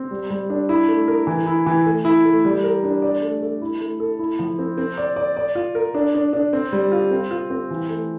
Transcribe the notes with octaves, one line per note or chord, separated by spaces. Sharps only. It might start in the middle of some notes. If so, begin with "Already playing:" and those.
Already playing: C4
G3
G3
D4
E4
A3
A#4
E3
E4
E3
A3
E4
A3
G3
A#4
D4
D5
A3
A3
E4
A3
A4
E4
F3
C4
C4
D5
D5
D5
F4
A#4
D4
D4
D4
C4
G3
F4
C4
F4
C4
E3
A3